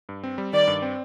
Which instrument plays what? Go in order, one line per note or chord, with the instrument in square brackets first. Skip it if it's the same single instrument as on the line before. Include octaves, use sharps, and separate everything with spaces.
[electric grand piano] G2
C4
G3
[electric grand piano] D#3 [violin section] D5
[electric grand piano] G2
C4